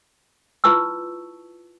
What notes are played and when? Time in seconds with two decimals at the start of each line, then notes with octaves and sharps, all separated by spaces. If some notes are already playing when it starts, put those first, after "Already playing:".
0.64 E4 F4 B4 A5 C#6 E6